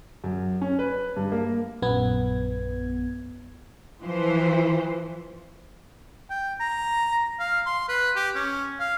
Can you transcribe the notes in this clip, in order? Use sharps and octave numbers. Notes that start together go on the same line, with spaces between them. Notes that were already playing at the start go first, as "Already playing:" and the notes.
F#2
C#4
B4
G2
A#3
A#1 F#2 B3 G#6
E3 F3 C5
G5
A#5
F5
C6
B4
G4
C#4
F5